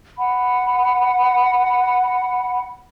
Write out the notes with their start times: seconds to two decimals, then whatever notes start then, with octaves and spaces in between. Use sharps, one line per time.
0.18 F#5 B5